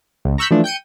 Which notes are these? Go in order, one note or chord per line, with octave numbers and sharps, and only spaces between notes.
C#2
A#5 C#6 E6 F#6 G6 B6
E3 F3 A3 D4
G5 G6 C#7 D#7